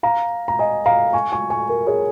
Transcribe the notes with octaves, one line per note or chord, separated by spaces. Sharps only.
F5 A#5
A#5
D#5 G#5
F5 A#5
G#5 C#6
G#5 C#6
G#5 C#6
A#4
G#4 C#5